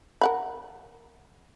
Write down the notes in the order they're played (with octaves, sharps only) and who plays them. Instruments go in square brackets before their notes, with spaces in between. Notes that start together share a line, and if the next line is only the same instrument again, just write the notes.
[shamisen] A#4 F#5 B5